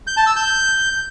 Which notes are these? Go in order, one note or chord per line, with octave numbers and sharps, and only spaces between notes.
G6
A5
E6
G6